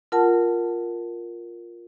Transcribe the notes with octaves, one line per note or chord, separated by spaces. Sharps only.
F4 A#4 F#5 A5